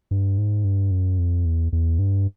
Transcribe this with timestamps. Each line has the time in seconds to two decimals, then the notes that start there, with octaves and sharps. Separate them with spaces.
0.11 G2
0.38 G#2
0.64 G2
0.91 F#2
1.19 F2
1.45 E2
1.73 E2
1.99 G2